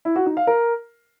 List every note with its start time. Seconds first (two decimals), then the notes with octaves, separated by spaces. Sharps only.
0.05 E4
0.16 F#4
0.26 D#4
0.37 F5
0.47 A#4